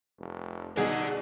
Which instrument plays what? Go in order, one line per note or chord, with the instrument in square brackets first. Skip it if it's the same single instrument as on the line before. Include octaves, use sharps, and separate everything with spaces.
[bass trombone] F1
[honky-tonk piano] C2 B2 G#3 [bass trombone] D#4 [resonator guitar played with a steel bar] G#4 [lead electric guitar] D5 F#5